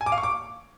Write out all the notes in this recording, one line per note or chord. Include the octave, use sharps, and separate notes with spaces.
G#5
D6
F5
C#6
D6